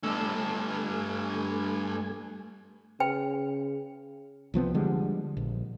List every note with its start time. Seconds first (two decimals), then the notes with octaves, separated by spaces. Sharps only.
0.03 G2 A3 A4 G#5
3.00 C#3 B4 G5
4.54 C2 F3 B3 C4
4.74 D3 F3 G3 G#3
5.37 A#1